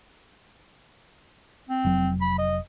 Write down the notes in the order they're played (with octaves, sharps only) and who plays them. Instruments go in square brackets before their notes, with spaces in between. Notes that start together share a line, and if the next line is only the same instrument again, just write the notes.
[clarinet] C4
[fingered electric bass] F1 F#3
[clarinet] B5
D#5